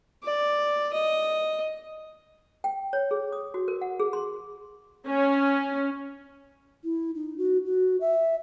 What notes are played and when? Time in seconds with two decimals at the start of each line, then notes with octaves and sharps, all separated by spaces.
0.24 D5
0.93 D#5
2.64 G5
2.93 C#5
3.11 G#4
3.32 D#6
3.54 F#4
3.68 A#4
3.81 F#5
4.00 G#4
4.13 C6
5.07 C#4
6.83 E4
7.15 D#4
7.38 F#4
7.66 F#4
8.01 E5